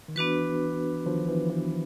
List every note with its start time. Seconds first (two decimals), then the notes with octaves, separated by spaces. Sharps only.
0.08 D#3
0.16 E3 B3 D4 F#4 B4
1.06 D#3 F3
1.28 E3
1.50 E3